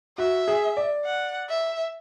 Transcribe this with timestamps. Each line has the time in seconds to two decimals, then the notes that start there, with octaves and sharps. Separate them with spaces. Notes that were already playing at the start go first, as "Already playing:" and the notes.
0.18 F#4 E5
0.48 G#4
0.77 D5
1.05 F#5
1.49 E5